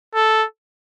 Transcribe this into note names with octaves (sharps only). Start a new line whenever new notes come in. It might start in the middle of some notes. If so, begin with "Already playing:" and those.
A4